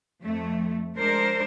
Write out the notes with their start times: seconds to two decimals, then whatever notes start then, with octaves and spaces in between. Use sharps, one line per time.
0.23 F2 A3
0.97 G#3 D4 A#4 C5